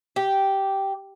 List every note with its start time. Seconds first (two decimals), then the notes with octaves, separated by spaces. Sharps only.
0.16 G4